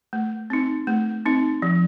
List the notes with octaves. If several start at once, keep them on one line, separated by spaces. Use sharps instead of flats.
A3
C4 D#4
A3
C4 D#4
F3